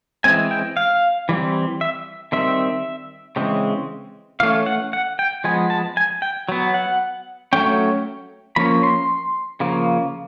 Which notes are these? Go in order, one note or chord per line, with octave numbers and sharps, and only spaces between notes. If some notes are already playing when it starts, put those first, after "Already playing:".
E3 G#3 C4 G#5
G5
F5
E3 G3 C4
E5
D#3 G3 C4 E5
C#3 E3 G#3 C4
E3 A3 C#4 F5
F#5
F#5
G5
F3 G#3 B3 G#5
A5
G#5
G5
F#3 B3
F#5
F#3 A3 C#4 G5
F3 A#3 C#4 B5
C6
C#3 F3 A#3